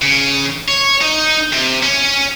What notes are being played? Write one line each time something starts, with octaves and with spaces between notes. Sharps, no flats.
C#3
C#5
D#4
C3
C#4